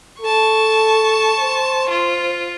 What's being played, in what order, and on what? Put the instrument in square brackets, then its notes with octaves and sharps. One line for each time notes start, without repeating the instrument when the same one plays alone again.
[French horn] A4 [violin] A5 C#6
[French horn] C5
[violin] F4